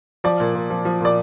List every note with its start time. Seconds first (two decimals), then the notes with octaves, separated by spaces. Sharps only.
0.24 F3 D5
0.40 A#2
0.55 A#2
0.70 F3
0.85 F3
1.01 A#2 D5